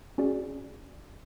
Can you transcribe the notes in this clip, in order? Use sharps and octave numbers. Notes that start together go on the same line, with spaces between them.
C#4 F#4 G#4 D5